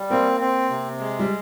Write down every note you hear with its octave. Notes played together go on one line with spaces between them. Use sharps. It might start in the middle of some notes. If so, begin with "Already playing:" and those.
Already playing: G3
A#3 C4
C4
C3
G#3
G3